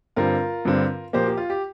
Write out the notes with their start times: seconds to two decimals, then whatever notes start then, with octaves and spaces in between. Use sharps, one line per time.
0.16 G2 D3 G3 C4 F4 A#4
0.65 G2 D3 G3 C4
1.13 A#2 F3 A#3 G4 C5
1.26 G4
1.37 F4
1.50 G4